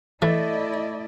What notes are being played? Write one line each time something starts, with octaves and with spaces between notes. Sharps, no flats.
E3 A3 E4 D5 D#5